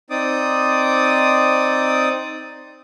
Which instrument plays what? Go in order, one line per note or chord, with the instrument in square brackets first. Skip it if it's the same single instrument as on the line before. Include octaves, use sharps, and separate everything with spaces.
[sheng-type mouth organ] C4 D#4 D5 D6 D#6